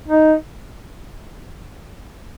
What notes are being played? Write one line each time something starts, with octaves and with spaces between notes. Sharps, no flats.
D#4